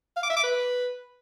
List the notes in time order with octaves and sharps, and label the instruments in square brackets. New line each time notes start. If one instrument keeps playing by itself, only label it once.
[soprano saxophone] F5
D6
E5
D6
B4